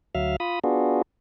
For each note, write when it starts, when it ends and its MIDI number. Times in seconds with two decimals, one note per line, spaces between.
0.15 0.36 38
0.15 0.36 54
0.15 0.36 76
0.15 0.36 77
0.15 0.36 89
0.40 0.59 65
0.40 0.59 83
0.40 0.59 87
0.64 1.02 59
0.64 1.02 62
0.64 1.02 65
0.64 1.02 66
0.64 1.02 68